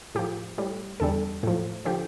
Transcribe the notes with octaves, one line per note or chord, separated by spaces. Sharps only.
A2 F3 G4
A2 G3
E2 D3 G3 A4
A2 F3
D3 F3 G4